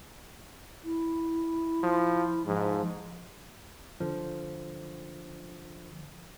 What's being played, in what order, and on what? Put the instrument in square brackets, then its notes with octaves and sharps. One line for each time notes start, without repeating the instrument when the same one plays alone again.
[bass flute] E4
[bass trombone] F3
[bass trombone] G#2 [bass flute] F3
[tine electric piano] D3 F3